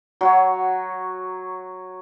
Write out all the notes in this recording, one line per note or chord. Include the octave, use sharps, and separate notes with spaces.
F#3 F#4 C#5